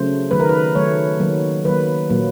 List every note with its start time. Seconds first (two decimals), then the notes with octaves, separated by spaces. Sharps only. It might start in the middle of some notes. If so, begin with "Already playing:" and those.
Already playing: C#3 F#3 A3 C5
0.31 D#3 F#3 A3 B4
0.40 A#4
0.49 B4
0.75 D#3 F#3 A3 C#5
1.20 D#3 F#3 A#3
1.65 D#3 F#3 A#3 B4
2.10 A#2 F#3 A#3